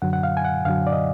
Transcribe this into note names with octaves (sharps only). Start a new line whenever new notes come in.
F#2 D3 F#3 F#5
F#5
F5
G#5
F#5
F#2 D3 F#3 F5
D5
D#5